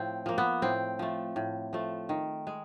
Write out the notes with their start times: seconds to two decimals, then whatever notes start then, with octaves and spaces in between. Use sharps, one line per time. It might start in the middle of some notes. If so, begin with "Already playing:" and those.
Already playing: A2 F3 C4
0.26 F3 A#3
0.38 B3
0.62 A2 C4
0.99 F3 A3
1.36 A2
1.73 F3 A3
2.09 D#3
2.47 G#3